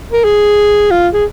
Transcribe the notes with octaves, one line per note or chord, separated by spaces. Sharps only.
A#4
G#4
F4
G#4